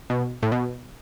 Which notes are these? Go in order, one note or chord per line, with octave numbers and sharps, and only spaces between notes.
B2
A2
B2